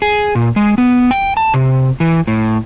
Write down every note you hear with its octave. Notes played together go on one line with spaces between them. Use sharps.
G#4
A#2
G#3
B3
G5
A5
C3
E3
A2